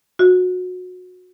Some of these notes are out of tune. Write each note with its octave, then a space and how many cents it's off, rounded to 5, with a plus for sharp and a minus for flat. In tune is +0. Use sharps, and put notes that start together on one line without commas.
F#4 -25